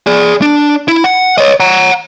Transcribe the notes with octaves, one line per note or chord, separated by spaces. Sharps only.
G#4 D5
D4
E4
F#5
C#5 D#5
F#5 A#5